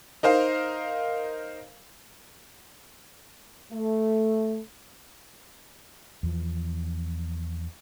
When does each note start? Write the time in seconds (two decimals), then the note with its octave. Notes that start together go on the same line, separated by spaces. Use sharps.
0.23 D#4 A#4 C5 F5
3.72 A3
6.23 E2 F3